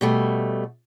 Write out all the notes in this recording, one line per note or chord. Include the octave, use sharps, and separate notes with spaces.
B2 G3 A3